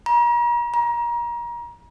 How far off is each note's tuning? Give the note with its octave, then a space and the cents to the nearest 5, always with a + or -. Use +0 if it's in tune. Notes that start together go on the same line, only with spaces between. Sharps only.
A#5 +40
A#5 +30